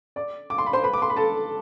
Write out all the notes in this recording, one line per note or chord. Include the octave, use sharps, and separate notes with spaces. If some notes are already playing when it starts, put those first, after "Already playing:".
D5 D6
D6
C6
B5
C5 C6
B4 B5
D6
C6
B5
A4 A5